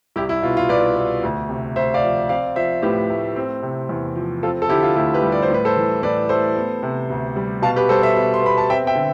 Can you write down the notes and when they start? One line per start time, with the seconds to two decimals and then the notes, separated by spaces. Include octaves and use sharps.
0.16 C2 E4 G4
0.29 E4
0.42 B2 F4
0.57 F4
0.69 C2 B4 D5
0.96 B3
1.23 D2
1.49 C3
1.76 D2 C5 E5
1.94 D5 F5
2.03 F3
2.29 C4 D5 F5
2.56 F3 C5 E5
2.82 A2 G4 B4
3.10 A3
3.36 C4
3.62 C3
3.89 E2
4.16 F3
4.43 C4 F4 A4
4.62 A4
4.69 D3 E4 G4
4.83 F4
4.95 D2 E4 G4
5.14 G4 B4
5.23 G3
5.32 D5
5.42 C5
5.50 A2 B4
5.65 A4 C5
5.77 E3
6.03 A2 B4 D5
6.29 A3 A4 C5
6.56 B3
6.83 C3
7.10 D2
7.36 G3
7.62 B2 F5 A5
7.76 G4 B4
7.89 G3 A4 C5
8.02 C5 E5
8.17 B2
8.34 C6
8.42 B3 B5
8.58 A5
8.70 C4 E5 G5
8.87 E5 G5
8.95 D3